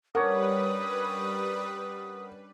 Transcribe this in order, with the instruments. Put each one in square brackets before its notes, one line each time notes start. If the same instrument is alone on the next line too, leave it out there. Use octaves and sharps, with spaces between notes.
[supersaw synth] G3 B4 [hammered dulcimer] C#4 D4 C#5 [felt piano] A#4 F#5 [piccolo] D#6